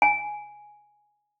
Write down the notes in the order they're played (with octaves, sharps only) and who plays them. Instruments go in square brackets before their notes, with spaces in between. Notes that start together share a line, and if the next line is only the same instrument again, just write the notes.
[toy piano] G#5